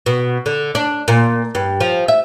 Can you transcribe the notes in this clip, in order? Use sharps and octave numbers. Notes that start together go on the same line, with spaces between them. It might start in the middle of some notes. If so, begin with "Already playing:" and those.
B2
D3
D4
A#2
G2
F3
E5